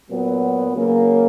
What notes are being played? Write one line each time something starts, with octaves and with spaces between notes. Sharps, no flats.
A#2 F#3 B3
C#3 F#3 A#3